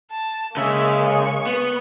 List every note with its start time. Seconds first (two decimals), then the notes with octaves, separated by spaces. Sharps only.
0.11 A5
0.57 C#3 G#3 A#3 E5
1.08 C#6
1.47 B3